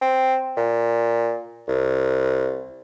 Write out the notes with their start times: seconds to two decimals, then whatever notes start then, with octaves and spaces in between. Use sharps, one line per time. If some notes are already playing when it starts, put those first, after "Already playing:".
0.02 C4
0.57 A#2
1.68 C2